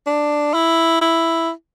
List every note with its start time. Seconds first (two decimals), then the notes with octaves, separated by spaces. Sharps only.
0.07 D4
0.54 E4
1.01 E4